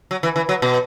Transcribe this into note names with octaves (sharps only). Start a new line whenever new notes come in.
F#3
E3
E3
F#3
B2